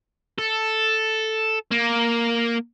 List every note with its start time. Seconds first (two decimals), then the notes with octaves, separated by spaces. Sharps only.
0.39 A4
1.71 A#3